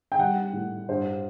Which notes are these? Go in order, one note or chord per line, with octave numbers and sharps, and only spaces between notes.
G5
G3 F#5
A2
G2 C5